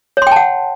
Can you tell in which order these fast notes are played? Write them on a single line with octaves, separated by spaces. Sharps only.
C#5 C6 G5 A5 F#5